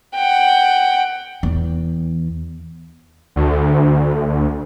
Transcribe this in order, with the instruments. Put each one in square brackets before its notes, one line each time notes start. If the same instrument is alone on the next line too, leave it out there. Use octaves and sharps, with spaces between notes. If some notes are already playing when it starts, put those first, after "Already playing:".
[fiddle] F#5 G5
[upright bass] E2
[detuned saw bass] D2